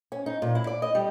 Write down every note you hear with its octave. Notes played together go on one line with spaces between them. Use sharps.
C#4
D#4
A#2
E4
D5
D#5
G3